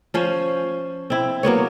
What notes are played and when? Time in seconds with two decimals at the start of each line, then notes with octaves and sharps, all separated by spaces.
0.14 F3 C#4 C5
1.10 C4 E4
1.43 F#3 A#3 B3 C#5